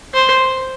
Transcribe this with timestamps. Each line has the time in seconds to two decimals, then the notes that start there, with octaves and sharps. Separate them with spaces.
0.14 C5